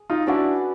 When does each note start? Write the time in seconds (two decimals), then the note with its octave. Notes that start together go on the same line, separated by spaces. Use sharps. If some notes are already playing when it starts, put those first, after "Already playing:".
Already playing: G#4
0.10 D#4 F4
0.27 C#4 D4 E4 F#4 B4 D5